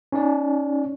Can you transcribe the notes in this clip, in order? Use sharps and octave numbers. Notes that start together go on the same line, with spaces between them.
C#4 D#4 D5